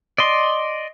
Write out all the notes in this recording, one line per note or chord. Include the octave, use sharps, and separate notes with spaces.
D5 D#5 C6